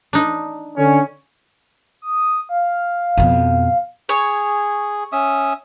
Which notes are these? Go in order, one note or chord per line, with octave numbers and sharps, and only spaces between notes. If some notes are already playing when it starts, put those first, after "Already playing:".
D4 D#4
D3 C#4
D#6
F5
F2 B2
G#4 C#5
C#4 E5 D#6